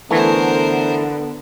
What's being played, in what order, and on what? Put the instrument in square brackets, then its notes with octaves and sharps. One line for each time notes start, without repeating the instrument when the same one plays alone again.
[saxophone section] D3 B3 [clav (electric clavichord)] E3 A3 [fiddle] A#4 C5